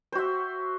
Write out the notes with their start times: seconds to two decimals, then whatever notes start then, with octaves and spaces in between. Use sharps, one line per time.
0.12 C5
0.15 F#4
0.18 E5